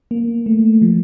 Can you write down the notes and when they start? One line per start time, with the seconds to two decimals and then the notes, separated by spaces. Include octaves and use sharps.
0.11 A#3
0.46 A3
0.82 F3